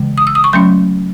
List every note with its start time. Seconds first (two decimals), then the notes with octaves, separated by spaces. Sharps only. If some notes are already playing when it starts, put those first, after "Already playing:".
Already playing: C#3 E3 G#3
0.18 D#6
0.27 E6
0.35 D#6
0.44 C#6
0.53 F#3 A3 C#4 C6